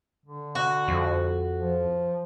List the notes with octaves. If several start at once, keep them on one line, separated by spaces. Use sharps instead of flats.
D3
F#4
F2
F3